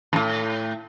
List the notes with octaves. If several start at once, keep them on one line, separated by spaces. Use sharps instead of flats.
D#2 A2